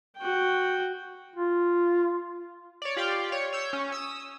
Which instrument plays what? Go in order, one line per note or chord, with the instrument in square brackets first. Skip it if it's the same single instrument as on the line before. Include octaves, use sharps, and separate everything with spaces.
[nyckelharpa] F#4 G5
[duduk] F4
[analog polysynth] C#5 D5
F4 G4 D5 F5 G5
C#5
C#5 E6 G6
C#4
D#6 E6